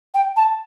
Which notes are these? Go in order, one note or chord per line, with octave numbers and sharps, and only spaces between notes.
G5
A5